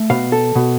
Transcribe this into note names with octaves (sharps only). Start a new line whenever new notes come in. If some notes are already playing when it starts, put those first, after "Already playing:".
Already playing: A3
B2 F5
A4
B2